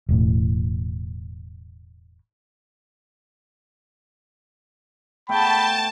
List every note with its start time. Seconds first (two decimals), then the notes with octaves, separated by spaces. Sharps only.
0.09 E1 A2
5.29 A3 B3 C#5 G5 A5 B5